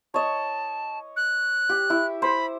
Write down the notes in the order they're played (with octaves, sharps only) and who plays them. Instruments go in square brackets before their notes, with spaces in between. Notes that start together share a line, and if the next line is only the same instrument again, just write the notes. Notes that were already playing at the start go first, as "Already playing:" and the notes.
[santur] C#5 D#5 [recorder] A5
[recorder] F#6
[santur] G4
E4
[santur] C5 [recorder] B5